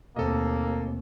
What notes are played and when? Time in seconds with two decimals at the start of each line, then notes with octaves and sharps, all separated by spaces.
0.16 D#2 B2 A3 A#3 C4 A4 D#5